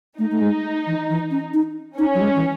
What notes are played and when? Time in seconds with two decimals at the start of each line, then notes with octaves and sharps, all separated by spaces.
0.19 A3 D#4
0.31 A3
0.41 G#3
0.87 E3
1.09 E3
1.31 C#4
1.54 D#4
1.98 C#4 D#4
2.15 F#3
2.21 G#3
2.36 E3